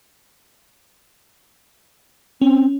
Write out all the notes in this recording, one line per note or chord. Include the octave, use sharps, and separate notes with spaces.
C4 C#4